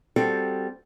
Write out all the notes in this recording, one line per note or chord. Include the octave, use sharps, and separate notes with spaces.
G3 C4 F#4 A4